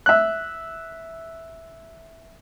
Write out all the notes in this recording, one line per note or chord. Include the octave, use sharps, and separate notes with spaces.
E5 F#6